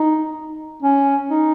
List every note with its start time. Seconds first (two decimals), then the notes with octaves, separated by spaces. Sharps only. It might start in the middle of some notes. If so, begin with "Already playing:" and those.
Already playing: D#4
0.83 C#4
1.30 D#4